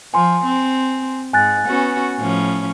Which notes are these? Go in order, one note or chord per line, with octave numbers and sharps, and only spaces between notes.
F3 G#5 C6
C4
G#2 G#5 F#6 A6
B3 C#4 F#4
A2 F3 C#4